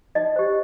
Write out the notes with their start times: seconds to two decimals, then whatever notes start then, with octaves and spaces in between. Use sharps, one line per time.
0.15 D#4 D#5
0.36 G4 C5